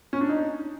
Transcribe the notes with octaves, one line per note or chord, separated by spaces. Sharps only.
C#4
D4
D#4